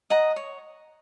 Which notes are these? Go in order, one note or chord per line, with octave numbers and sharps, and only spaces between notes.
D#5 F#5 A#5
C#5